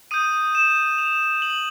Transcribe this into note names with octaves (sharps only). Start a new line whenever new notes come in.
D#6 G6 D#7
E7
F7
F#7